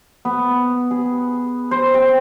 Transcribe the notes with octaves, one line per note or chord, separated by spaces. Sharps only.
B3
G#4
C5
G5